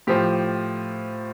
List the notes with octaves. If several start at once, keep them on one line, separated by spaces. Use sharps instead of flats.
A2 F3 G4